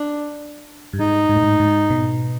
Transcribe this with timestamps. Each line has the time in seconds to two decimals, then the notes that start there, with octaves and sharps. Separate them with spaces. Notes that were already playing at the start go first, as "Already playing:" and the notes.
Already playing: D4
0.93 G2
0.99 G#2 D#4
1.29 G#2
1.36 A2
1.44 G#2
1.60 G#2
1.90 B2